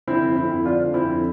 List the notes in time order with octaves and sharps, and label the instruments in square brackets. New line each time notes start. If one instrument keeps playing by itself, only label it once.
[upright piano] D3 C4 E4
F2
C4 E4
F2
D3 D4 F4
D3
C4 E4
F2